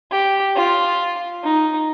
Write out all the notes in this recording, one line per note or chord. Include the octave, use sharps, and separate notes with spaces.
G4
F4
D#4